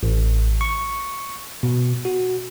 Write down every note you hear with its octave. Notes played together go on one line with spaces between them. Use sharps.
A1
C#6
B2
F#4